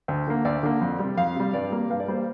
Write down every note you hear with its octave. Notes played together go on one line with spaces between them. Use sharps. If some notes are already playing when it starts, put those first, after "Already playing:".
D2
D3 A#3
D2 D5
D3 A#3
F2
C3 G3
F2 F5
C3 G3
G2 D5
G3 A#3
G2 F5
D5
G3 A#3 C5